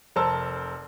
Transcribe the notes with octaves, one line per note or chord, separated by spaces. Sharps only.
F1 A#4 C5 A5 E6